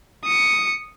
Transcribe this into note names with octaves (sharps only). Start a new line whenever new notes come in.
D#6 C#7